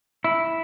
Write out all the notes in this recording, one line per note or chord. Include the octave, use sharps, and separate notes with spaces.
E4